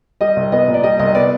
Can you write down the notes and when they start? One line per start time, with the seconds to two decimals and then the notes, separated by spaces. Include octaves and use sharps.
0.21 G3 D#5
0.36 C2
0.52 B3 D#5
0.68 A#2
0.74 D5
0.84 G3 D#5
0.99 C2 D#5
1.15 B3 D5